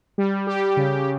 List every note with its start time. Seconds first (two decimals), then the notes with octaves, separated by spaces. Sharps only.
0.18 G3
0.47 G4
0.77 C#3